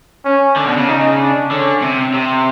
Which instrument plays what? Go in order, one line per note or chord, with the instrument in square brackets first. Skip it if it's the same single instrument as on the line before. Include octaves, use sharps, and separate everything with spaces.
[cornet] C#4
[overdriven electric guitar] D3 [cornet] D4
[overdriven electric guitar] B2
C#3
[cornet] D#4
D4
[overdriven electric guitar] D3 [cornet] C#4
[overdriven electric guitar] C3
C3